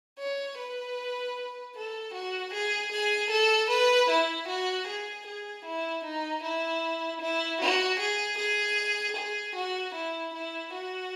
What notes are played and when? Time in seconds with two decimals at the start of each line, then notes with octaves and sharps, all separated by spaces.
0.19 C#5
0.58 B4
1.75 A4
2.14 F#4
2.53 G#4
2.92 G#4
3.31 A4
3.70 B4
4.10 E4
4.48 F#4
4.87 G#4
5.27 G#4
5.65 E4
6.04 D#4
6.43 E4
7.21 E4
7.61 F#4
8.00 G#4
8.39 G#4
9.17 G#4
9.55 F#4
9.95 E4
10.34 E4
10.73 F#4